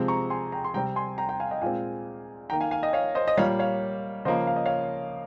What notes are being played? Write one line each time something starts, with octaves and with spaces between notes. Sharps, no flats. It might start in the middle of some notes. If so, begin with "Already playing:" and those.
Already playing: C3 F3 G#3 C4
A#5 C#6
G#5 C6
G5 A#5
C6
C3 G3 C4 G5 A#5
G#5 C6
G5 A#5
G5 A#5
F5 G#5
D#5 G5
A#2 G#3 C4 F5 G#5
D#3 A#3 G5 A#5
F5 G#5
F5 G#5
D#5 G5
C#5 F5
C5 D#5
D#5
A#2 G3 A#3 C#5 F5
C#5 F5
C#3 F3 A#3 C5 D#5
F5
D#5
C#5 F5